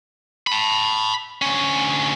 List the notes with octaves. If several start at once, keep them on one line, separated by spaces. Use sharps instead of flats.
A5 B5
D2 C#4